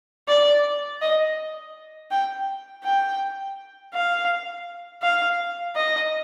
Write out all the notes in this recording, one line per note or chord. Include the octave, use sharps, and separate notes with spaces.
D5
D#5
G5
G5
F5
F5
D#5